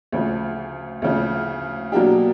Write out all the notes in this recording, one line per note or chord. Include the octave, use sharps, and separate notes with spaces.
D2 C#3 F3
D2 C#3 F3
B2 F#3 A#3 D4 G4